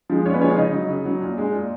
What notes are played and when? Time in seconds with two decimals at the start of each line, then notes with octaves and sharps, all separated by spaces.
0.10 F3 G#3
0.25 A#2 C#4 C#5
0.33 B3 B4
0.41 F3 G#3 C#4 C#5
0.49 F4 F5
0.57 C#3 D#4 D#5
0.73 F#3
0.89 C#3
1.05 F#3
1.21 A#2
1.38 G#3
1.53 A#2